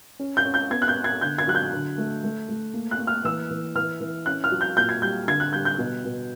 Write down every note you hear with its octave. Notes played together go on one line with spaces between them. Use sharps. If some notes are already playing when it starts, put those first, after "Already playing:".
C#4
G6
C#4
G6
B3 G#6
F#6
G6
B3
G#6
D3 G6
G#6
F#3 F#6
G6
D3
A3
A3
A3
A#3
F#6
A#3
F6
E3 E6
E3
E3 F6
E3
C#4 F#6
F6
F#3
G6
A#2 G6
G#6
G3 G6
D3 G#6
F#6
G3 G6
G6
B2
B2